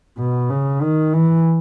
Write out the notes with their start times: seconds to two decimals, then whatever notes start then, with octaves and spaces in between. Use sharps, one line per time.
0.19 B2
0.50 C#3
0.82 D#3
1.13 E3